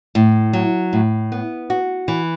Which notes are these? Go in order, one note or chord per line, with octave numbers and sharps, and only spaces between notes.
A2
F#3
A2
B3
F#4
E3